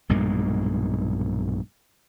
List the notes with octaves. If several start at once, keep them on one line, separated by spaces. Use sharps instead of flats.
B1 G2 A#2 G#3